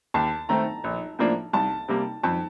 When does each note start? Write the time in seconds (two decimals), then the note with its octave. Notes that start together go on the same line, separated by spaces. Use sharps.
0.14 D#2 A5
0.49 D#3 A3 C4 A#5
0.84 A#1
1.19 A2 F3 A#3 D4
1.53 C2 A5
1.88 C3 G3 A#3
2.23 F2 A5